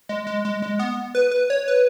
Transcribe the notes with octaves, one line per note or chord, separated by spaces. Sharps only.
G#3
G#3
G#3
G#3
B3
B4
B4
C#5
B4